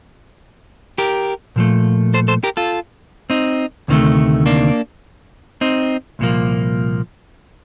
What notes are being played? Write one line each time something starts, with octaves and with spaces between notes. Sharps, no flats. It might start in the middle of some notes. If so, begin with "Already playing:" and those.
G4 A#4
A#2 F3 A3
A4 C5
A4 C5
G4 A#4
F4 A4
C4 D#4
D2 C3 D#3 A3
A#3 D4
C4 D#4
C2 A#2 F3 A#3